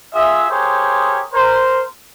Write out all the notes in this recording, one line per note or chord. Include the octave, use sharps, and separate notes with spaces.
F4 G#4 E5
G4 G#4 A#4 C5 C#5
A#4 C5